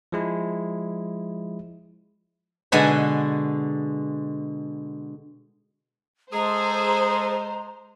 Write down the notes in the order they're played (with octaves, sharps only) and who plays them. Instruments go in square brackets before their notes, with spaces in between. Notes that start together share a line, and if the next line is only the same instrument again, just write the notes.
[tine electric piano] F3 G#3 E4
[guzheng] B2 D3 G#3 F#5 G#5 B5
[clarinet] G#3 [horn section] G#4 A4 [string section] C5 [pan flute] A#5